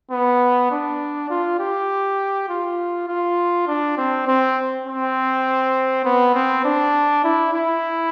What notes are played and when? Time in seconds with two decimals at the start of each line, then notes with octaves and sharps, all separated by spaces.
0.11 B3
0.71 D4
1.30 F4
1.60 G4
2.49 F4
3.08 F4
3.67 D4
3.97 C4
4.27 C4
4.86 C4
6.05 B3
6.35 C4
6.65 D4
7.24 E4
7.54 E4